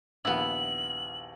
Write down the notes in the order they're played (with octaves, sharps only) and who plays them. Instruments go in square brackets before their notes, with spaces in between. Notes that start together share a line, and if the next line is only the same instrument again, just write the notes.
[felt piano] A#1 D#2 [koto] B3 E4 [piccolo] F#7